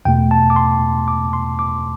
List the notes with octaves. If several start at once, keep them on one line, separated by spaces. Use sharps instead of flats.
E2 B2 A3 G5
A5
D6
C6
D6
C6
D6